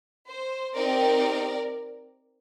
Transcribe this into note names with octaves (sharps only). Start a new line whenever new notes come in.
C5
C4 D#4 G4 A#4 D5